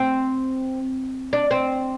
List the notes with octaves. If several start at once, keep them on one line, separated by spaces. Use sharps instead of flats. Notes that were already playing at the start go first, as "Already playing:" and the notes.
Already playing: C4
D4
C4